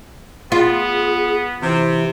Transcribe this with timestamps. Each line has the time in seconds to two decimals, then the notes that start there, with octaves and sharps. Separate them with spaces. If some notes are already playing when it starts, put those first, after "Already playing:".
0.52 B3 F4 G#4
1.61 C3 E3